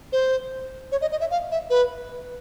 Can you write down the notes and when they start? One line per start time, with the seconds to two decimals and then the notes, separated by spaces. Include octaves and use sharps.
0.12 C5
0.92 C#5
1.01 D#5
1.12 D#5
1.20 E5
1.31 F5
1.51 E5
1.70 B4